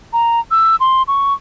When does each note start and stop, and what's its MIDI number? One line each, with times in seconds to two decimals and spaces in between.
0.13 0.40 82
0.51 0.76 88
0.80 1.03 84
1.08 1.34 85